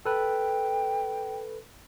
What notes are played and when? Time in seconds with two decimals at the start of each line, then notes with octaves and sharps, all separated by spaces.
0.05 A4 B4 G5